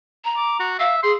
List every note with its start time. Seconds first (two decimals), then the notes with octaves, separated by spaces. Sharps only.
0.25 A#5
0.37 D6
0.60 F#4
0.80 E5 F5
1.03 G#4 C6